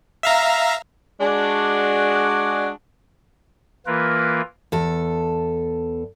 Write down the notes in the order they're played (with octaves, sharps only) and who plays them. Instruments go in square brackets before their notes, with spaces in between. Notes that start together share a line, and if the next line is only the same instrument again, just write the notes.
[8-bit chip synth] E5 F5 A#5
[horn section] G#3 D4 F#4
[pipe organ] E3 A#3 F4 A#4 B4
[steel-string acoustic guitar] E2 A4